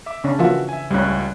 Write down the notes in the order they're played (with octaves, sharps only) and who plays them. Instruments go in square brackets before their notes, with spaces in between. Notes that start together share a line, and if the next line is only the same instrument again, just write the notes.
[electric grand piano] E5 D6
[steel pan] C#3 C#4 D4
[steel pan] E3 [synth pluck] F3 A#3 F4 [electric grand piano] F#4 E5
[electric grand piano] E5 G#5
[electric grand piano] C#2 A2 F#6 [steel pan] G3 C#4